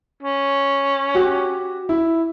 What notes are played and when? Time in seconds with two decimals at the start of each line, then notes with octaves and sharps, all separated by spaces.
0.23 C#4
1.15 F#4 G4
1.89 E4